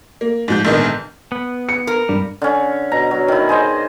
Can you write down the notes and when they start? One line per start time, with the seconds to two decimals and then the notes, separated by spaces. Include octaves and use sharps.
0.21 A#3
0.48 G#2 F3 G6
0.65 A#1 G#2 D3 D#3 B3 D#5
1.32 B3
1.69 C#7
1.87 A#4
2.09 G2 G3
2.42 D3 C#4
2.92 B2 A#5
3.11 F#3
3.28 D#3 E4
3.49 G#4 C5 D#5